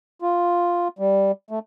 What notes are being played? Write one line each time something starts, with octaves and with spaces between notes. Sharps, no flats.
F4
G3
A3